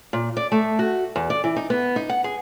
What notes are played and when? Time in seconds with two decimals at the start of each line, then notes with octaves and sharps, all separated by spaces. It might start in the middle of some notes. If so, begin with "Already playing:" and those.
0.13 A#2
0.37 D5
0.52 A3
0.79 F#4
1.16 E2
1.30 D5
1.44 E3
1.56 D#4
1.70 B3
1.96 D#4
2.09 F#5
2.24 G#4